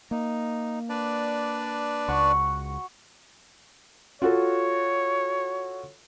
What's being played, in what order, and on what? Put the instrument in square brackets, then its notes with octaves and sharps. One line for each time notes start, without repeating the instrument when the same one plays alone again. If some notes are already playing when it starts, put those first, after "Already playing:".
[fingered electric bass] A#3 [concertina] D#4
[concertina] D4 B4 D5
[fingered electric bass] C#2 [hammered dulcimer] F#4 F#5 C#6
[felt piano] F4 F#4 A4 [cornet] C#5